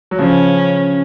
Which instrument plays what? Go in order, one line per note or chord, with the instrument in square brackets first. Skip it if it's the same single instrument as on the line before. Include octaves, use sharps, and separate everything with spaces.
[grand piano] F#3
[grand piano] C#3 F3 [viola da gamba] C#4